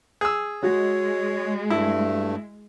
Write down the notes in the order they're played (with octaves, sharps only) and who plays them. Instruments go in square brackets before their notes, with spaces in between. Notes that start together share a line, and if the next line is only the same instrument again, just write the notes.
[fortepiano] G#4 E6
[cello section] G#3 [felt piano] F#4 [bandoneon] C#5
[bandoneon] G2 A3 [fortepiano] E4